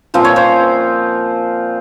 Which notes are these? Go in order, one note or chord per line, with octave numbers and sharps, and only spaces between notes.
A#2 F3 C4 F4 C5
C#5
C5